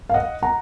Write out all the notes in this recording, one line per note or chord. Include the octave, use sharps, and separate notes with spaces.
F5
D#5 F#5
F#5 A#5